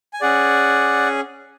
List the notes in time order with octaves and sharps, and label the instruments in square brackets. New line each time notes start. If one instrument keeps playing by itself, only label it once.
[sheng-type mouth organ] G#5
C#4 G#4 D5 F#5